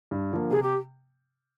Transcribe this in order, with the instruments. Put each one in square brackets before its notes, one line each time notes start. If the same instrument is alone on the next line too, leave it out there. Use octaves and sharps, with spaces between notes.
[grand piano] G2
D3 F3 A#3
[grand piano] C3 [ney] G#4
[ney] G4